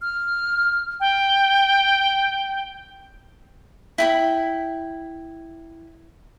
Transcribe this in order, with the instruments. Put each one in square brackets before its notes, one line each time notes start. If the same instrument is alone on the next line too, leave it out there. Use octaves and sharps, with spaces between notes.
[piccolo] F6
G5
[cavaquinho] E4 G5 B5